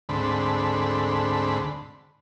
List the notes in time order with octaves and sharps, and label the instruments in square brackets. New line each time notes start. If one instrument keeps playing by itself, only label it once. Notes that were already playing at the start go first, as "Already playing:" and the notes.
[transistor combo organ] D2 G#2 D3 A3 C4 B5